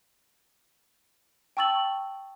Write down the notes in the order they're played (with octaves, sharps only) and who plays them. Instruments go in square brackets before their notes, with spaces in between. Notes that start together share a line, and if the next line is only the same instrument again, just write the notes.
[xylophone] G5 A5 C#6 E6 A6 F#7